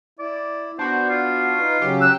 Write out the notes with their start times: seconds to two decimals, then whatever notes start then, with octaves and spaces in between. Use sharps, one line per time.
0.19 E4 D5
0.79 B3 D4 F#4 C5
1.10 F4
1.59 D#4 B4
1.82 C#3 F#3 G4
2.01 E6 F#6